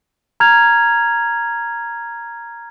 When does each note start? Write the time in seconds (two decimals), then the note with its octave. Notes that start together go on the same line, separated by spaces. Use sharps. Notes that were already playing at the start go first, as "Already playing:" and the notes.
0.40 A#5 F6 G#6 F7